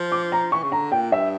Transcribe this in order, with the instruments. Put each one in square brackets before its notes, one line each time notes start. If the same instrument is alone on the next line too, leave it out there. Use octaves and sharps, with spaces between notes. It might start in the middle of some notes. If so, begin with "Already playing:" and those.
Already playing: [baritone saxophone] F3
[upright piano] D6
A#5
[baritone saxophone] E3 [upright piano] C#6
[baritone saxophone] C#3
[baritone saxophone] D3 [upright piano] A#5
[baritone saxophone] A#2 [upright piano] G5
[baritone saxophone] G2 [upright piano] E5